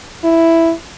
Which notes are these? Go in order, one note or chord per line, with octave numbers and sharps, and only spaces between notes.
E4